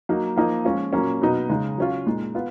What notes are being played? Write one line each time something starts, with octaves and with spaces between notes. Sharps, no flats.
F#3 A#3 D#4
F3 A#3 D#4
F3 G#3 C#4 F4
A#2 F#3 A#3 C#4
B2 F#3 B3 D#4
C#3 G#3 D#4
F#3 C#4 F4
A#2 G#3 D#4
B3 F4